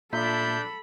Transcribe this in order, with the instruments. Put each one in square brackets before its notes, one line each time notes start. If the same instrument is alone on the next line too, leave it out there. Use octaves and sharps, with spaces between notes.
[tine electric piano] A#2 E5 B6 [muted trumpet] D4 [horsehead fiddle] A4 B5 [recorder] G6